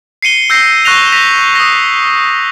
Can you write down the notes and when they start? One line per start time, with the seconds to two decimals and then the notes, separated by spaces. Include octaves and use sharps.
0.22 C7 C#7 D#7 G7
0.50 E6 G6 A#6 C7
0.85 C#6 F#6 A#6 D#7 F7
1.12 A#6 B6 D#7 F7
1.55 D#6 A#6